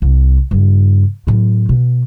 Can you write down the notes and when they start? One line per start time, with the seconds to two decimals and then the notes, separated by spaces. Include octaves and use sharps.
0.02 C2
0.51 G2 C#3
1.27 A2 F#3
1.69 B2